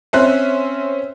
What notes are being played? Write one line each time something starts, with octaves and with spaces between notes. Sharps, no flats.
C4 C#4 C5 E5 F#6